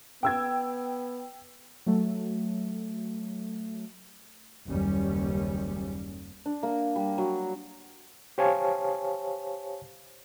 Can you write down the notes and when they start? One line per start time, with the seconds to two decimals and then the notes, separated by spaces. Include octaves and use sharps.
0.23 B3 G5 E6 G#6
1.86 F#3 A3
4.67 F#1 D#2 G3 C#4
6.46 D4
6.63 A#3
6.96 G3
7.18 F#3
8.38 G4 C5 C#5 F5 G#5 A5